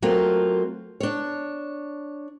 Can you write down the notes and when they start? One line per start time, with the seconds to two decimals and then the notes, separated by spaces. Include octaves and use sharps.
0.02 F#3 A3 A#3 C4 F4
1.00 D4 C#5